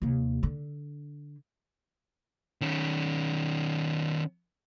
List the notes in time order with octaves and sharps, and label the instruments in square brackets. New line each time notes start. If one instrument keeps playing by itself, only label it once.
[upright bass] D#2 C3
D3 D4
[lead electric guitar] D#3 C#4